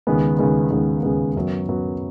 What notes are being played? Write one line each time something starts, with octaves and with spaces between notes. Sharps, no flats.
D#2 C#3 G#3 B3
D#2 C#3 G#3 B3
D#2 C#3 G#3 B3
D#2 C#3 G#3 B3
F#2 F#3 B3
F#2 F#3 B3